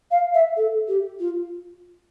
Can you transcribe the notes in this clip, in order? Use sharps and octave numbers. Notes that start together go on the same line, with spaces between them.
F5
E5
A4
G4
F4